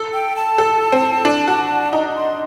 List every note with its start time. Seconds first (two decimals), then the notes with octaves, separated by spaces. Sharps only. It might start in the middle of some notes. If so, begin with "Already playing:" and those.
Already playing: A4
0.13 G5
0.36 A5
0.58 A4
0.92 C4
1.25 D4
1.48 F#4
1.93 D#4 A#5
2.10 A#5
2.16 C6